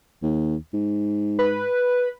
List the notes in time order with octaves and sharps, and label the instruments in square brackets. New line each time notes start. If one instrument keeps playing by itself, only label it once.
[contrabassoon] D#2
G#2
[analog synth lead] B4